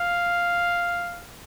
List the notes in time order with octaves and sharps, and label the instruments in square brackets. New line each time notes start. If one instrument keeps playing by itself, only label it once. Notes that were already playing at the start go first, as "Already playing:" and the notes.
Already playing: [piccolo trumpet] F5